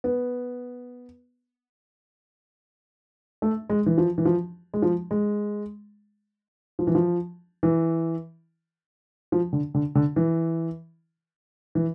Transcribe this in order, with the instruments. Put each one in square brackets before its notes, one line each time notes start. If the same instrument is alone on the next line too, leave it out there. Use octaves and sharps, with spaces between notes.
[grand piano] B3
A3
G#3
E3
F3
E3
F3
G#3
F3
G#3
F3
E3
F3
E3
F3
D3
D3
D3
E3
E3